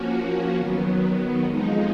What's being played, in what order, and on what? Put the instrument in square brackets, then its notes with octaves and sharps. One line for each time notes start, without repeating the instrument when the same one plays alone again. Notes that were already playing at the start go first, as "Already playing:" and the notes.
Already playing: [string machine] F3 A#3 C#4 F#4
D#3 F#3 B3
F2 F3 G#3 D#4